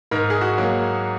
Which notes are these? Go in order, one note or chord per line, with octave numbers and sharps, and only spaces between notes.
G#2 A#4
G#4
F#4
F#3 A#3